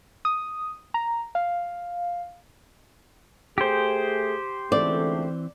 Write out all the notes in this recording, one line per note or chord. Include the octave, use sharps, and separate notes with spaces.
D#6
A#5
F5
A3 G4 G#4 C5
C#2 D3 E3 A3 C4 D5